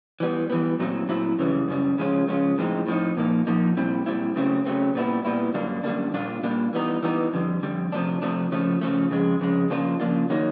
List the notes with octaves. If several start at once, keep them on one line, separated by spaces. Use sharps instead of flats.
E3 G3 B3
E3 G3 B3
A#2 F#3 A3 C4 E4
A#2 F#3 A3 C4 E4
F#2 C#3 E3 G3
F#2 C#3 G3
C#3 F3 G#3 C#4 F4
C#3 F3 G#3 C#4 F4
A2 F3 G#3 C4 D#4
A2 F3 G#3 C4 D#4
A#2 F3 A#3 D#4
A#2 F3 A#3 D#4
A#2 G3 C4 E4
A#2 G3 C4 E4
C#3 F#3 A3 C4
C#3 F#3 A3 C4
A#2 G3 B3 E4
A#2 G3 B3 E4
F#2 D3 G3 A#3 D4
F#2 D3 G3 A#3 D4
A#2 G3 A#3 D4 F4
A#2 G3 A#3 D4 F4
E3 G3 B3 D#4
E3 G3 B3 D#4
F2 D3 G3
F2 D3 G3
C3 F3 A3 D4
C3 F3 A3 D4
C#3 F3 A3
C#3 F3 A3
F2 C#3 G#3
F2 C#3 G#3
C#3 F3 A#3 D4 F4
C#3 F3 A#3 D4 F4
D#3 F#3 A#3 D#4